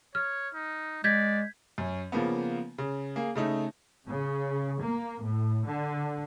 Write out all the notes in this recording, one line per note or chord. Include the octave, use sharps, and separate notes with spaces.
C#5 F6
D#4
G#3 D5 G6 G#6 B6
F#2 C#4
C#3 F3 A#3 B3
C#3
A#3 G#4
C#3 A3 D#4
C#3
A#3
A2
D3